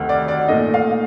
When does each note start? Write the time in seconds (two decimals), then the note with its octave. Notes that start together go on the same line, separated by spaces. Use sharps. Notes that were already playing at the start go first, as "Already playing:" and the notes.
Already playing: D2 C3 D#3
0.09 D5
0.28 D5
0.48 A#2 A3 D#4 D#5
0.74 F5